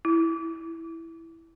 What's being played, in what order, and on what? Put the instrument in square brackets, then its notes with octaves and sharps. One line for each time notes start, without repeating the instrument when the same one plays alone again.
[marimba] E4